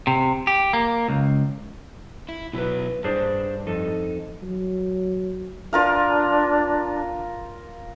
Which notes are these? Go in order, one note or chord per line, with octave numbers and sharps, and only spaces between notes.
C3
G4
A#3
C#2
E4
B2 F#3 E4 B4
G2 D4 G#4 C5
F2 D#4 A4
F#3
D4 F4 A#4 F5